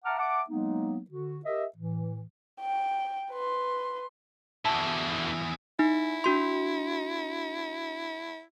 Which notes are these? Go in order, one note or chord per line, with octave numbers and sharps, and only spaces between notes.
E5 F#5 A5 A#5 D6 F6
E5 F#5 A5 D6
F#3 G#3 A#3 B3 D#4
D3 F#4
G4 A#4 D#5 E5
A2 E3
G5
B4 C6
E2 B2 D3 E4 F#4 A5
D#4 E4
D4 F#4 C6